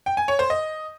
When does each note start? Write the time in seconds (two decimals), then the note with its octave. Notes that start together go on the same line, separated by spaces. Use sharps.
0.06 G5
0.17 G#5
0.28 C#5
0.39 C5
0.50 D#5